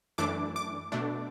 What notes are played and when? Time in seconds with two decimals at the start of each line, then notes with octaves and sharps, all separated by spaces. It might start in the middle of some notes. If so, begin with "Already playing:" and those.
0.18 F#2 E3 A3 D4 D6
0.56 D6
0.92 B2 A3 D4